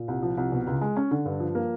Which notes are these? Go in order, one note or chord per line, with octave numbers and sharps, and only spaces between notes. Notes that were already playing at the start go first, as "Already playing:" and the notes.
Already playing: A#2
C2
F3
C2
B2
C#2
G#3
C#4
D3
G2
F3
A#3